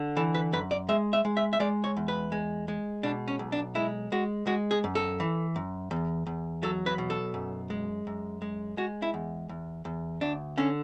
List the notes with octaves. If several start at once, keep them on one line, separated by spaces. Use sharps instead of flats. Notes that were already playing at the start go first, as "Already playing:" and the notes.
Already playing: D3
E3 A4
B4
F#2 B4
D5
G#3 E5
E5
G#3
E5
E5
G#3 D5
C#5
E2
B4
G#3
G#3
B2 D4
C#4
B1
D4
G#3 E4
G#3 F#4
G#3 F#4
G#4
F#2
A4
E3
F#2
E2
E2
F#3 A4
B4
B2
A4
F#2
G#3
F#2
G#3
G#3 F#4
E4
E2
E2
E2
D2 D4
D3 C#4